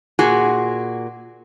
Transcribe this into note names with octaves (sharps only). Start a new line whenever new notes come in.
A#2 F#4 G#4